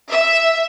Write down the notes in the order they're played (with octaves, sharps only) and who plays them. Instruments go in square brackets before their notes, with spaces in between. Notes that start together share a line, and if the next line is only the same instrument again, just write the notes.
[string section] E5